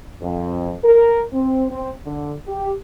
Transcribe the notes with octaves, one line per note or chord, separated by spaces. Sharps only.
F2
A#4
C4
C4
D3
G4